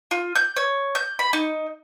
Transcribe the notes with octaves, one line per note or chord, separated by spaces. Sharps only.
F4
G6
C#5
G6
B5
D#4